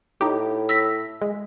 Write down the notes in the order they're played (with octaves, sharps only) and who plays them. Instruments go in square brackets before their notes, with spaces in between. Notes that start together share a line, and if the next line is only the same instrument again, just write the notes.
[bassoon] A2 [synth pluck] D#4 G4
[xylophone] E6 A#6 B6
[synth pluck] G#3